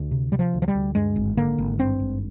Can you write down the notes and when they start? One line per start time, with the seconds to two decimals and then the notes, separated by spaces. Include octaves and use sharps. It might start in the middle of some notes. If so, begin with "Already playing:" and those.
Already playing: D2
0.11 C3
0.32 C3 G3
0.39 F3
0.54 D2
0.62 F3
0.68 G3
0.75 D2
0.95 G2 G#3
1.16 G#1
1.37 D3 A#3
1.58 G#1
1.79 G2 C4
1.99 G#1